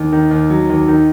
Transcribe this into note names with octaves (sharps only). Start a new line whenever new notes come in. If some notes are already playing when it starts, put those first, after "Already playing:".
Already playing: D#2
D#3
D#2
F#3
D#2
D#3